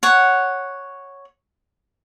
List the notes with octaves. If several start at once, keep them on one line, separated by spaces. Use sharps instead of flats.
C#5 F#5